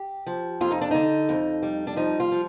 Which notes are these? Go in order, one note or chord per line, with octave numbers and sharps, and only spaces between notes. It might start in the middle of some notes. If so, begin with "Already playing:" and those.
Already playing: G4
F3
F2 F4
D#4
D4
D3 D#4
F2
G3
D4
F3 D#4
F4
F3